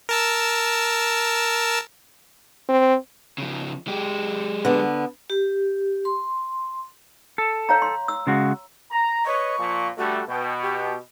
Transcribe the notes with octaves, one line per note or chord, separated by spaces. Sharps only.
A#4 A5 E6
C4
C#3 F3
G#3 G4
D3 B3
G4
C6
A4
C#5 F5 A#5
C6
E6
C#3 G#3 F#4
A#5
B4 C#5 D#5 C#6
A#2 F3
D3 G3 A3 F#4
B2 G5
G4